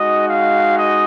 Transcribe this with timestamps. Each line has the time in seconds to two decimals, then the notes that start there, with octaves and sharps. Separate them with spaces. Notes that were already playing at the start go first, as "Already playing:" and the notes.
Already playing: G#3 D#4 F#4 D#5
0.28 F5
0.76 D#5